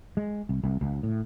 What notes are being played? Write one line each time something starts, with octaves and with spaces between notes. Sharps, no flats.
G#3
C2
C2
C#2
A2